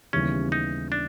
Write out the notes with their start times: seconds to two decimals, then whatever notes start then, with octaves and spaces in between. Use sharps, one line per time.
0.13 D#2 C#3 E3 G3 B3 C#4
0.52 D#4
0.92 D4